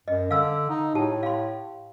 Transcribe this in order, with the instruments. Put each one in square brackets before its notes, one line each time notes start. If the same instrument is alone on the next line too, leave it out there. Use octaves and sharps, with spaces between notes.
[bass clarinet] F#2 [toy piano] D#5
[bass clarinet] D3 [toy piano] F5 E6
[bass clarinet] D#4
[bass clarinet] A2 [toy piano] G4 A5
[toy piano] F5 C6